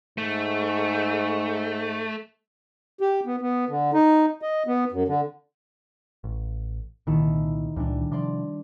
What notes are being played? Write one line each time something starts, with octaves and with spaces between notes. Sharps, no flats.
G#2 A3
G4
B3
B3
D3
D#4
D#5
B3
F#2
D3
A1
C2 A#2 D#3 E4 A4
C#2 A#2 E3 G3 D4
C3 F3 D5 C6 D6